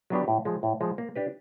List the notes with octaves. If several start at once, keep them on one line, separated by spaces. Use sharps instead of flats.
F#3 B3 D4 G4
A2
F3 G#3
A2
F3 G#3
A#3
D4 G4 B4